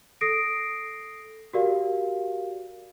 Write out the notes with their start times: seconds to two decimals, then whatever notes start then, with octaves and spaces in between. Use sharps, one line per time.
0.21 A4 D#6 A#6 C7 D7
1.53 F#4 G4 A#4 D5 F5